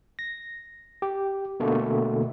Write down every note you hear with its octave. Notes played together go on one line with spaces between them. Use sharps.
A#6
G4
B2 D3 A3 A#3